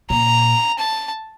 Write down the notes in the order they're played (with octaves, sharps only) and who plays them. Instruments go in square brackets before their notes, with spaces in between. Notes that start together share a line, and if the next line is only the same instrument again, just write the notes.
[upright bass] A#2 [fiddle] A#5
[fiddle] A5